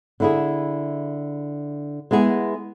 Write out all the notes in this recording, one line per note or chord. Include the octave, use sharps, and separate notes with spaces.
D3 E4 G#4
G#3 B3 E4 G#4